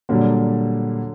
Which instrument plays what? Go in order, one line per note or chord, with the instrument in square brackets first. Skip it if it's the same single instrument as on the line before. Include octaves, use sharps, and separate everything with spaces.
[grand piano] A#2 G3 A#3 [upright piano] D3 F#3